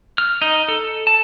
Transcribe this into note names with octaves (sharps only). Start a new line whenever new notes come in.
F6
D#4
A4
A5